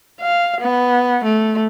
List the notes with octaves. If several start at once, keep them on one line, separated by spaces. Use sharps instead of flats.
F5
B3
A3